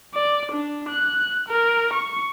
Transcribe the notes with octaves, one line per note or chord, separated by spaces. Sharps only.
D5
D4
F#6
A#4
C#6